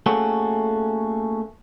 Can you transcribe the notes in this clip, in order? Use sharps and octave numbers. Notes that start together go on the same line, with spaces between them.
A3 A#3 C#4 F#4 G#4 A4